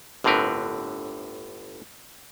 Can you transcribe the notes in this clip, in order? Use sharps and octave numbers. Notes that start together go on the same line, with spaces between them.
G1 A2 D3 C4 A#4 B4